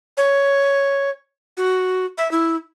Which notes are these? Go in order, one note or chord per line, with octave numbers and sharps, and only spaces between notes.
C#5
F#4
E5
E4